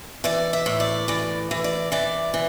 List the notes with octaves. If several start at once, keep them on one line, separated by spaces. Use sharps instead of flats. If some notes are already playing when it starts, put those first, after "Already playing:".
E3 D5
E5
A2
D5
E3 D5
E3
D5
E3 D5
E3